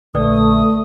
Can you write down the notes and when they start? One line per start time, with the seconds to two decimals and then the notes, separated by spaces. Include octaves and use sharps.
0.15 A#1 D3 A3 B4 D5 G5 D#6